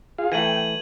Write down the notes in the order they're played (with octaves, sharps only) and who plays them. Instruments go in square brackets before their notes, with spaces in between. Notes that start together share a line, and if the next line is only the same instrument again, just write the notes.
[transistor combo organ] F4 G#4 F5
[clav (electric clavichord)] E3 A3 [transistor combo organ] G5 [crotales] G#6 D#7 F#7